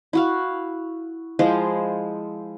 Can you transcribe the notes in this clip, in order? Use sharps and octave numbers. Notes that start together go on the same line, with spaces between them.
E4 F#4 F5
F3 G#3 E4 C5